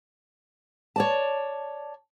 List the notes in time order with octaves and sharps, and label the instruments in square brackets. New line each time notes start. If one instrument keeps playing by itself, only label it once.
[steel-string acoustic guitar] C#5 D5 A5